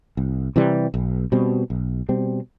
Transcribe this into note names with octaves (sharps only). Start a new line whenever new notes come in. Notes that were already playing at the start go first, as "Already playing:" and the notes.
C2
C3 E3 G3
B1
B2 G3 C4
B1
B2 G3 C4